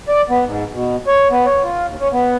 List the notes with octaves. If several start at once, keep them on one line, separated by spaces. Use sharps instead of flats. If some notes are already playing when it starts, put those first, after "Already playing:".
D5
B3
G#2
B2
C#5
B3
C#5
F4
D#2
C#4
B3